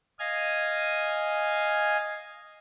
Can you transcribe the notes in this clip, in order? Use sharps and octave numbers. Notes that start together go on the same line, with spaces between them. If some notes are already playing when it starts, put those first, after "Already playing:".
D#5 F5 G#5